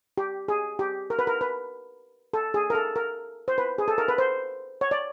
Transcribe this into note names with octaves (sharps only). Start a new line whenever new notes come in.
G4
G#4
G4
A#4
B4
A#4
B4
A4
G#4
A#4
A4
A#4
C5
B4
G#4
A4
A#4
B4
C5
C#5
D5